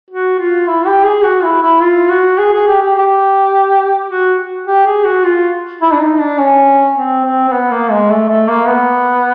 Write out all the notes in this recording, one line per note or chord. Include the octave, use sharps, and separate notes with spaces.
F#4
F4
E4
G4
G#4
F#4
E4
E4
F4
F#4
G#4
G#4
G4
G4
G4
F#4
G4
G#4
F#4
F4
E4
D4
D#4
D4
C#4
C4
C4
C4
B3
A#3
G#3
A3
A3
A#3
B3